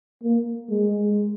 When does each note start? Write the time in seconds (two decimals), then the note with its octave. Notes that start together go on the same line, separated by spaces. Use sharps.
0.24 A#3
0.70 G#3